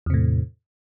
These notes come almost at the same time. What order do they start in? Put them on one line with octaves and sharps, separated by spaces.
E2 C3 A2